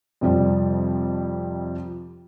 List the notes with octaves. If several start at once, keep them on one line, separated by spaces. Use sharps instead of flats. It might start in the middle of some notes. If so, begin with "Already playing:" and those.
F2 C3 F3 G3